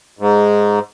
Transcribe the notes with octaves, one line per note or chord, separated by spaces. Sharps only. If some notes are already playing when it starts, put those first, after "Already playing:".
G#2